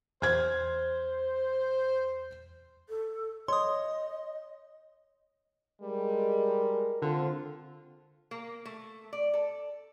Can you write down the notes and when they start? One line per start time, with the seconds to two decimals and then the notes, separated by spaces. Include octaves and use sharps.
0.22 E2 C5 F6 G#6
2.89 A4
3.48 C#5 D#5 C6 D#6
5.82 G3 G#3 A#4
7.02 D3 C4 F4 A4
8.31 A#3
8.65 A3
9.13 D5
9.33 A4